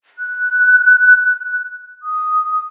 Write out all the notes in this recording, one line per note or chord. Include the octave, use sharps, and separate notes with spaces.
F#6
D#6